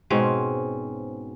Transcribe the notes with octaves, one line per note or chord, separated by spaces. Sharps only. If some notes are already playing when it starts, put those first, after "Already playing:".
G#2 B2 C4 C#4